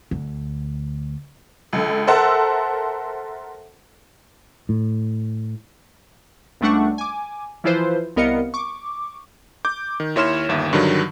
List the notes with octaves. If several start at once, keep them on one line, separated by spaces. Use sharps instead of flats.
D2
C#2 D3
A4 A#4 C5 E5 F#5 A5
A2
C#2 G3 A3 D4 F#5 C#6
G#5 D6
E3 F3 E4 F4 B4 C5
C2 B3 A#4 D#5 F5 C#7
C#6 D6
D6 G6
D#3
D#2 E4 C#5 C6 F6 E7
G1 D#2 E5
G2 D3 D#3 F#3